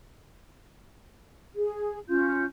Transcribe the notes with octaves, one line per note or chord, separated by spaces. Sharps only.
G#4
C#4 F4 G6